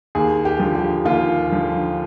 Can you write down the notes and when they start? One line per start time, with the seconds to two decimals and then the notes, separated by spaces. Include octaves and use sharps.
0.15 D#2 G#4
0.45 G4
0.60 D3 F3
0.75 G4
1.05 D#2 F4
1.51 D3 F3